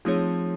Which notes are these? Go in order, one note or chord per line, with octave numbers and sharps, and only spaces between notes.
F3 A3 C4 D#4 G#4 C#5